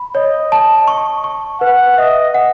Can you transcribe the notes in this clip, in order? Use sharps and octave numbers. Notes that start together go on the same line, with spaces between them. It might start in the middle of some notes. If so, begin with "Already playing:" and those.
Already playing: B5
C#5 D#5
A5
C#6
C#6
B4 F#5
D#5 E5
F#5